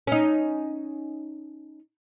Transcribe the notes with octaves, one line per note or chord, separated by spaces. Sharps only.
C#4 D#4